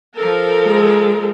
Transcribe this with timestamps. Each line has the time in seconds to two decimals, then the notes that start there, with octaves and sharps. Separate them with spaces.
0.18 F3 A4 A#4
0.67 G#3